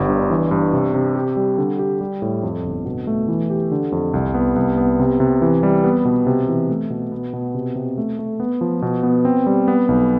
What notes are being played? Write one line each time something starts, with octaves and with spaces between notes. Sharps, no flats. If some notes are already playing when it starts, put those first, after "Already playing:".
Already playing: G1 G3
G2
E3
G2
C3
C3
G4
G3
D3
G4
G3
A2
F2
G1
B2
A3
E3
G4
D3
F2
C2
B3
C2
B3
C3
C3
E3
G3
B3
B2
C3
E3
A3
B2
B3
B2
C3
C3
A3
A3
B3
F3
B2
B3
C4
G3
B3
B1